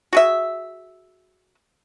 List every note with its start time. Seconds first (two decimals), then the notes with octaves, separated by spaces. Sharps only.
0.13 F#4 G#4 E5